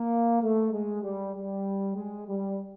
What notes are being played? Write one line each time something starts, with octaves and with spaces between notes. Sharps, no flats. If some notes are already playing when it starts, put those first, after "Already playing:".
Already playing: A#3
A3
G#3
G3
G3
G#3
G3